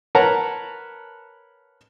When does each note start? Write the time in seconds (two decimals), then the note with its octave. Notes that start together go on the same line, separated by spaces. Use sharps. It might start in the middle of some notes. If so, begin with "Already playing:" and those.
0.15 A#4 B4 C#5 F#5 A5 A#5